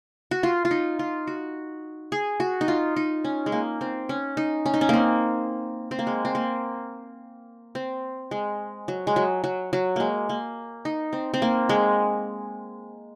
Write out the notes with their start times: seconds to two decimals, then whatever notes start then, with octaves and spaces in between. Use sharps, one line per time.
0.31 F#4
0.43 F4
0.65 F4
0.71 D#4
0.99 F4
1.27 F#4
2.12 G#4
2.40 F#4
2.61 D#4
2.68 F4
2.96 D#4
3.24 C#4
3.46 G#3
3.52 A#3
3.81 C4
4.09 C#4
4.37 D#4
4.66 C#4
4.74 D#4
4.81 C#4
4.89 A#3 C4
5.91 C4
5.99 A#3
6.07 G#3
6.25 C4
6.35 A#3
7.75 C4
8.31 G#3
8.88 F#3
9.07 G#3
9.16 F#3
9.44 F#3
9.73 F#3
9.96 G#3 A#3
10.29 A#3
10.85 D#4
11.13 C4
11.34 C4
11.42 A#3
11.69 G#3